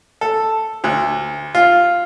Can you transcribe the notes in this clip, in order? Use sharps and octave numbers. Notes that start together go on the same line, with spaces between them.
A4
D2
F4